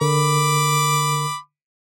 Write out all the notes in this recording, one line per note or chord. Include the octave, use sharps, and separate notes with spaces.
D3 A#4 B5 D6